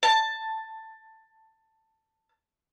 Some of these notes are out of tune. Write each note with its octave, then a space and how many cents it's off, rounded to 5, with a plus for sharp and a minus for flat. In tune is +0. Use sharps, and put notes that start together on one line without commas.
A5 +10